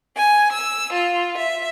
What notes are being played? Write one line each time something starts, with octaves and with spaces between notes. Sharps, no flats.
G#5
E6
F4
E5